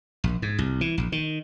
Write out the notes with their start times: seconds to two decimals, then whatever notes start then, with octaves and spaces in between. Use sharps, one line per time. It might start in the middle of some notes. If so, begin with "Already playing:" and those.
0.24 A#1
0.42 G#2
0.58 C2
0.81 E3
0.98 A#1
1.12 D#3